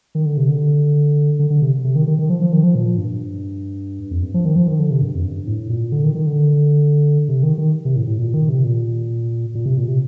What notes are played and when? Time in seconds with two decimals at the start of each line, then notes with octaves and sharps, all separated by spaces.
0.15 D#3
0.26 D3
0.37 C3
0.49 D3
1.39 D3
1.50 D3
1.62 C3
1.84 C3
1.96 D#3
2.07 D#3
2.19 D#3
2.29 F3
2.41 F3
2.53 D#3
2.63 F3
2.75 A#2
2.98 G2
4.11 F2
4.23 G2
4.34 F3
4.45 D#3
4.56 F3
4.68 D#3
4.79 D3
4.91 C3
5.01 G2
5.15 F2
5.24 G2
5.47 A2
5.70 A#2
5.92 D3
6.04 D#3
6.15 D#3
6.26 D3
7.28 C3
7.43 D#3
7.58 D#3
7.85 C3
7.96 A2
8.07 A2
8.19 A#2
8.34 D#3
8.49 C3
8.64 A#2
9.55 A#2
9.66 C3
9.77 A#2
9.88 C3